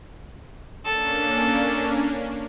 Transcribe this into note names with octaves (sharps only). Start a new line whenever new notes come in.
A#3 C#4 D4 A4